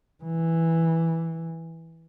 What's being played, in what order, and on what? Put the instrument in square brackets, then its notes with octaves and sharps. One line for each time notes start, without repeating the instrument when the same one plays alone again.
[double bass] E3